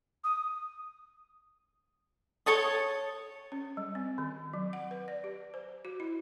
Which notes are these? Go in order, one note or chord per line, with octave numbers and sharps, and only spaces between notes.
D#6
A4 C#5 A5 D#6
C#4
G3
C4
D#3
F#3
F#5
B4
D5
G4
C5
F#4
E4